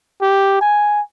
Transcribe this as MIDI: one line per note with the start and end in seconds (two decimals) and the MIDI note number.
0.22 0.60 67
0.61 1.01 80